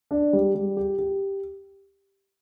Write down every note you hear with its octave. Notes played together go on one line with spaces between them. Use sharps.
D4
G3
G3
G4
G4